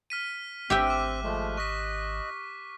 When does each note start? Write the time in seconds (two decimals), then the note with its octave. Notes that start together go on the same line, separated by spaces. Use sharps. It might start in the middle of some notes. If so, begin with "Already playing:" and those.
0.10 F6 B6 D#7
0.70 G#1 C4 G4 E5 G5
0.87 D6 F#6
1.24 F3 G#3 A3
1.57 D#5 C#6 F#6 B6